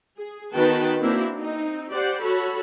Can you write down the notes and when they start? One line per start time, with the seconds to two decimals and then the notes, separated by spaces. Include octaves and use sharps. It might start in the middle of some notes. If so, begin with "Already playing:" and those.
0.18 G#4
0.54 D#3 B3 F#4 B4 G5 A5
1.01 A#3 C4 D4 E4 F#4
1.36 C4 D#4
1.91 G4 C5 D5 F#5
2.22 F#4 A4 C#5 B5